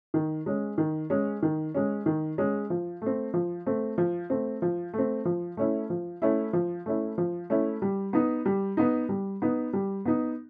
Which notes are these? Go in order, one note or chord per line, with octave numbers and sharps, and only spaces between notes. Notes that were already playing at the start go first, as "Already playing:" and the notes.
D#3
G#3 C#4
D#3
G#3 C#4
D#3
G#3 C#4
D#3
G#3 C#4
F3
A3 C4
F3
A3 C4
F3
A3 C4
F3
A3 C4
F3
A3 C#4 E4
F3
A3 C#4 E4
F3
A3 C#4 E4
F3
A3 C#4 E4
G3
B3 D#4
G3
B3 D#4
G3
B3 D#4
G3
B3 D#4